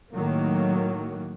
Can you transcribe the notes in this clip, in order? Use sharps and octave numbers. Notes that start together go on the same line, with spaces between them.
A2 D#3 F#3 A#3